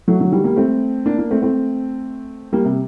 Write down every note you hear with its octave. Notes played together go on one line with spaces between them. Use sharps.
F#3 A3
D3 F#3
D#3 G3
G3 A#3
A3 C4
A#3 D4
A#3 D4
A3 C4
A3 C4
G3 A#3
C3